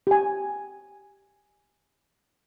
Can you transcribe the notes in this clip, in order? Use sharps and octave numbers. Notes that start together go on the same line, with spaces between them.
G4 G#5